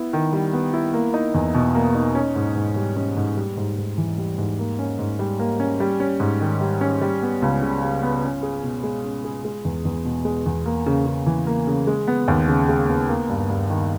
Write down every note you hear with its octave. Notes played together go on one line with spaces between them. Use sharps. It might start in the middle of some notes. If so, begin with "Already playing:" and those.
Already playing: B3 E4
D#3
G3
B3
E4
A#3
D#4
E2
B2
A#3
D#4
C#4
G#2
G#2
G3
C#4
G#2
G3
G#2
G#2
E3
G3
G#2
A#3
C#4
G#2
G3
A#3
C#4
G3
C#4
G#2
D#3
G3
C#4
G3
B3
C#2
C#3
G3
B3
C#4
G#4
B2
G#3
C#4
G#4
G#3
E2
E2
B2
G#3
E2
A#3
C#3
C#3
E3
A#3
C#3
G#3
B3
D#2
C#3
G#3
B3
A#3
G2
G2
D#3